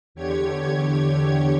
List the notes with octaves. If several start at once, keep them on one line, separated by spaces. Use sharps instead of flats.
E2 D3 G4 C#5 G#6